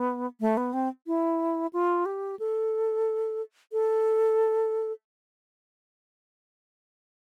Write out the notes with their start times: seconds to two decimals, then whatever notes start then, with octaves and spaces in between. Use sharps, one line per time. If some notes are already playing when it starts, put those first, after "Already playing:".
Already playing: B3
0.41 A3
0.57 B3
0.73 C4
1.07 E4
1.73 F4
2.06 G4
2.39 A4
3.72 A4